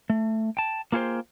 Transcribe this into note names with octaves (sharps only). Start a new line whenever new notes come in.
A3
G5 A5
A#3 F4 G#4 A4 C5 G5